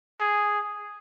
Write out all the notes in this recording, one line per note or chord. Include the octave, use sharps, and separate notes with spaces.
G#4